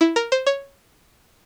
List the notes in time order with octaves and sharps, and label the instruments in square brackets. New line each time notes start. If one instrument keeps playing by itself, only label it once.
[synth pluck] E4
A#4
C5
C#5